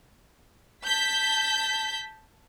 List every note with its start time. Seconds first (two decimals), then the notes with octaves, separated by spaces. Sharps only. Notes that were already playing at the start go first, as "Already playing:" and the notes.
0.84 A5 G6 B6